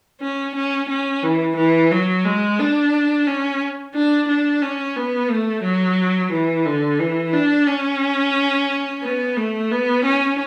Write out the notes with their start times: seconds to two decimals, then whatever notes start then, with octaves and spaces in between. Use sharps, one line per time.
0.21 C#4
0.55 C#4
0.89 C#4
1.23 E3
1.56 E3
1.91 F#3
2.25 G#3
2.59 D4
3.27 C#4
3.94 D4
4.28 D4
4.62 C#4
4.96 B3
5.30 A3
5.63 F#3
6.32 E3
6.65 D3
6.99 E3
7.33 D4
7.67 C#4
9.03 B3
9.36 A3
9.71 B3
10.05 C#4